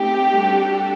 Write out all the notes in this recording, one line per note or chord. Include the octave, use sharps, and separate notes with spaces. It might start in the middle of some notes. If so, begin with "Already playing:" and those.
Already playing: A3 C4 D#4 G4
G3 D4 F#4 A4